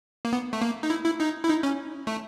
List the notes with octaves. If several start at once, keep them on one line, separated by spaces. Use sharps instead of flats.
A#3
B3
A3
A#3
D#4
E4
E4
D#4
E4
D#4
C#4
A3